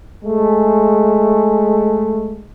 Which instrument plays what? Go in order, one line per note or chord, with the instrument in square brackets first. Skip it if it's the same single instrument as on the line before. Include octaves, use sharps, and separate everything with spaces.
[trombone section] G#3 A3